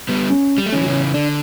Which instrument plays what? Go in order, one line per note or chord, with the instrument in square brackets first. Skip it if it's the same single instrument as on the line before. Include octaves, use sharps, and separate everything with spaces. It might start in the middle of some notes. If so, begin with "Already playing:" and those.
[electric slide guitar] G3 B3
[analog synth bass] C#4
[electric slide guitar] G3
A3
[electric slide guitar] E3 G3 [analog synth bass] C#4
[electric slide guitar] F#3
C#3 E3
[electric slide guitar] D3 [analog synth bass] D4